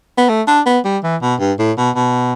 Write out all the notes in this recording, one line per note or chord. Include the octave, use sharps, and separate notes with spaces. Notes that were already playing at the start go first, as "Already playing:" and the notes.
B3
A3
D4
B3
G3
E3
B2
G2
A2
B2
B2